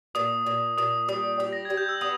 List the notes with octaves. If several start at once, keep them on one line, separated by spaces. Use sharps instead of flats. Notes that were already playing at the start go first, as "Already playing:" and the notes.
A#2 D#6
A#2
A#2 D#6
G3 D#6
G4 D#6
A#6
G3 G#6
G6
E6
B3 D#6